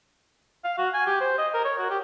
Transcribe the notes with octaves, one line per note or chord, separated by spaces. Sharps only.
F5
F#4
G#5
G4
C5
D#5
A#4
C#5
F#4
G4